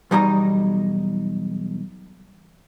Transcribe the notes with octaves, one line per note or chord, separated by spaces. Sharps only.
B1 E2 G3 D#4 F#4 A#5